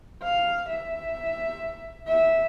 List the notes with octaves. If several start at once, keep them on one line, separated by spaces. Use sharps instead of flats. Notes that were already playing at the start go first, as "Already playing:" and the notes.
F5
E5
E5